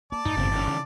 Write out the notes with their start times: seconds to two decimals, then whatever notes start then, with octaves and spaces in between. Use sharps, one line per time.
0.12 A#3 D5 A5
0.25 F#2 A2 D#4
0.37 G1 E2 C#3 C4
0.52 D#3 E3 C#4
0.67 C#3